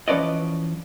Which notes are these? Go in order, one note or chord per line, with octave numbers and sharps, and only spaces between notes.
E3 F3 C#4 B4 D5 D#5